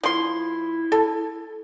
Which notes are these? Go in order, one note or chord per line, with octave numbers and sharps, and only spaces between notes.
F3 E4 C6
A4